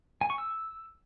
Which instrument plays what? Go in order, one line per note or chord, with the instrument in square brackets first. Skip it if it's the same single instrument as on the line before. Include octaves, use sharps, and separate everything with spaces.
[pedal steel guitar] G#5
C#6
E6